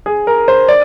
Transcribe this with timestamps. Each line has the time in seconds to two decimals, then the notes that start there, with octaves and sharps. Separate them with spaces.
0.06 G#4
0.27 A#4
0.48 C5
0.69 D5